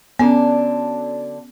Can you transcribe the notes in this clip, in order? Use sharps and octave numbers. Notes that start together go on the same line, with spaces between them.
D3 F#3 B3 C#4 D4